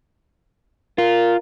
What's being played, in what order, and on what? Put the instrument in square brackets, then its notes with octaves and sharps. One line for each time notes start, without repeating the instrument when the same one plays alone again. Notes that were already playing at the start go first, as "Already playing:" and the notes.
[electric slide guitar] F4 [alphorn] A#4